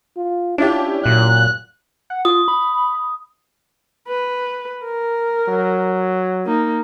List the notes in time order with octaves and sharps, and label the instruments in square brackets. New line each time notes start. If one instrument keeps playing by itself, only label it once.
[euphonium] F4
[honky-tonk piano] C#4 E4 G4 [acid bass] D4 [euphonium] F4
[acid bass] A#2 [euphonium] F#3 [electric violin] F#6
[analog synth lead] F#5
[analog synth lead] F4 [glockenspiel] D#6
[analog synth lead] B5
[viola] B4
A#4
[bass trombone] F#3
[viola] A#3 D#4